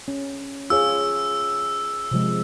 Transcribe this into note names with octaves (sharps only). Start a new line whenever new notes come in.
C#4
F4 G#4 C#5 E6
C3 F3 G#3